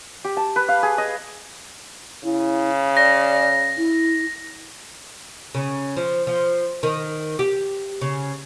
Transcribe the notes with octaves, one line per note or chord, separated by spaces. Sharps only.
G4
A5
B4
F5
G#4
D#5
C#3 E4
D5 A#6
E4
C#3
F3
F3
D#3
G4
C#3